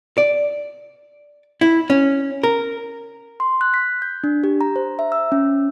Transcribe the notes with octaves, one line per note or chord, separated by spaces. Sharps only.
D5
E4
C#4
A#4
C6
F#6
B6
G6
D4
G4
A#5
C5
E5
E6
C#4